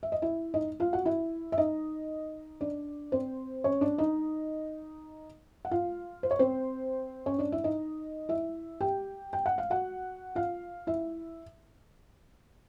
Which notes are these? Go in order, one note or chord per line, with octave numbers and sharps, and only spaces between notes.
E5
D#5
E4 E5
D#4 D#5
F4 F5
F#4 F#5
E4 E5
E5
D#4 D#5
D4 D5
C4 C5
C#4 C#5
D4 D5
D#4 D#5
F#5
F4 F5
C5
C#5
C4 C5
C#4 C#5
D4 D5
E4 E5
D#4 D#5
E4 E5
G4 G5
G5
F#5
F5
F#4 F#5
F4 F5
E4 E5